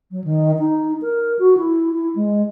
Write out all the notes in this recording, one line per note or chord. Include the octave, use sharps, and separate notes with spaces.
F#3
D#3
D#4
A#4
F#4
E4
E4
G#3